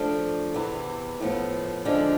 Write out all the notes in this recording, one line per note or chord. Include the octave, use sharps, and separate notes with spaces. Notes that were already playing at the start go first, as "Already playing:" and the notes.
Already playing: F3 A3 D4 A4
E2 C3 E3
A2 F3 B3
D3 F3 G#3 D4